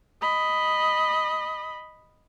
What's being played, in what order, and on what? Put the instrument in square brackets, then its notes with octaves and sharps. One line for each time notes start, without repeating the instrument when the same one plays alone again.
[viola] D#5 B5